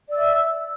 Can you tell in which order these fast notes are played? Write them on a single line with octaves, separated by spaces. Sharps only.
D5 E6 E5